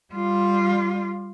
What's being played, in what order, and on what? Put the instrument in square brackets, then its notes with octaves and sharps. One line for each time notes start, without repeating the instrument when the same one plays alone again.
[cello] G3 F4